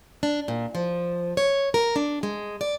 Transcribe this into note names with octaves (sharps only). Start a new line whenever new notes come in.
D4
A#2
F3
C#5
A#4
D4
G#3
D5